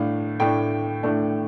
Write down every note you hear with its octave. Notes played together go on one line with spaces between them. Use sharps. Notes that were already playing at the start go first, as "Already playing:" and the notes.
Already playing: A2 A3 D4 F5
A2 A3 D4 G5
A2 A3 D4